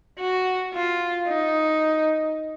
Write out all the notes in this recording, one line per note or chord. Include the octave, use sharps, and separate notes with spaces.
F#4
F4
D#4